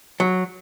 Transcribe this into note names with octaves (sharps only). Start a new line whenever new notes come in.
F#3